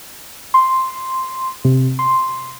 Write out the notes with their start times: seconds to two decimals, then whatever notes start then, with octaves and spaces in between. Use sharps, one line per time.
0.54 C6
1.65 C3
1.99 C6